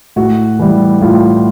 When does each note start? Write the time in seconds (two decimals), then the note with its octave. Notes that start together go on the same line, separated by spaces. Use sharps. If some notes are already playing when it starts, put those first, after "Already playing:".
0.16 A2 F#4
0.59 E3 G3
1.01 A2 F4